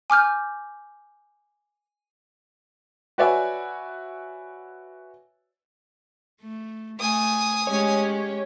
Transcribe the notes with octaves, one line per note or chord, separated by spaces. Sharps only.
G#5 D6 F6 G6
F#4 B4 C#5 D5 E5 G#5
A3
A3 G#5 D#6
G#3 C#4 G4 C#5